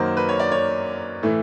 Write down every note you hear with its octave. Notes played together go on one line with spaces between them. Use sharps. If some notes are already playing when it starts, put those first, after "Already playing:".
Already playing: F#2 D#3 F#3 A#3 C5
B4
C#5
D5
C#5
A2 E3 A3